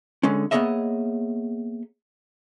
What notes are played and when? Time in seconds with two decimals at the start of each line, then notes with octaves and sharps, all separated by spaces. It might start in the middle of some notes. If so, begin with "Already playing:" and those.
0.23 D3 G#3 C#4
0.51 A#3 B3 G#4 C#5 D#5 E5